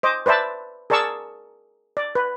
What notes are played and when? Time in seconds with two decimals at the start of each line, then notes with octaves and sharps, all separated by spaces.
0.03 C5 D#5 D6
0.26 B4 C5 D5 E5 A5
0.90 G#4 A#4 D5 A5 C#6 E6
1.97 D5
2.15 B4